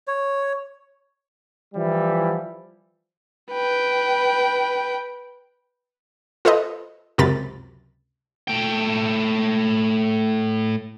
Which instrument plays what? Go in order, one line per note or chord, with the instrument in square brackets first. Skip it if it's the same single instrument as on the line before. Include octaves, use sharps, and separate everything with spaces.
[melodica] C#5
[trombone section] E3 F3 G3 E4
[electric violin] B4 G5
[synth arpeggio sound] F4 A4 B4 C5 D#5
C#2 F#2 C3 A#4 B5 A6
[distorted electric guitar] A2 G5